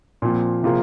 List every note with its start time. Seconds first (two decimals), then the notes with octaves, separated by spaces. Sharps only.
0.22 A#2 F3 C4
0.63 C3 F3 A#3 F4 G#4